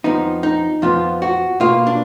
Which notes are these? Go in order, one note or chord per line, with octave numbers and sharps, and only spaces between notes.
F2 F3 B3 D#4
D#4
F2 F3 B3 F4
F#4
B2 A#3 F4
D4